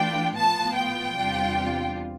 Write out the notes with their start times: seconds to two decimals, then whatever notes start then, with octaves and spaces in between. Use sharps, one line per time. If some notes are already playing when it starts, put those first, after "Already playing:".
Already playing: E3 A3 D4 F4 G5
0.35 A2 F3 B3 F4 A5
0.76 G5
1.17 E2 C3 G3 D4 F4